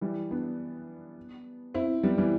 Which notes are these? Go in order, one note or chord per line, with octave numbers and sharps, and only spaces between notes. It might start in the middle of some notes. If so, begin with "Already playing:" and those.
E3 G3
B3 D4
C4 E4
G3 B3
E3 G3